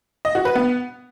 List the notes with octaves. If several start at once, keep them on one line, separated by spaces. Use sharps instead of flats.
D#5
F#4
B4
B3